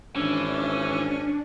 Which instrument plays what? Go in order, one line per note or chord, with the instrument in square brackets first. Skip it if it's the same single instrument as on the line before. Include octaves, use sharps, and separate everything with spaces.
[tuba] G#1 [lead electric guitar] E3 [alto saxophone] C#4 [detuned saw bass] D4